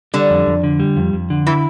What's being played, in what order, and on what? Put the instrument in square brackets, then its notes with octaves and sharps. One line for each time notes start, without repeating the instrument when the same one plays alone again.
[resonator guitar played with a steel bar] D3 [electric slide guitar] G3
[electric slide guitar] F2
F2
D3
G3
F2
F2
D3
[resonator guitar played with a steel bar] E3 [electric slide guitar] E4